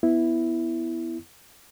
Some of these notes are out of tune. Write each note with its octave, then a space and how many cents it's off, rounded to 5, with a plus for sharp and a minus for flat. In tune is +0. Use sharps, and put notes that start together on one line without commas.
B3 +0 E4 +0